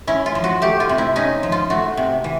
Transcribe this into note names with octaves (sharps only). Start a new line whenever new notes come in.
C#4 E4
F4
F3
F#4
A3 G4
F4
C3
E4
C#4 D#4
F3
F4
A3 F#4
C3
E3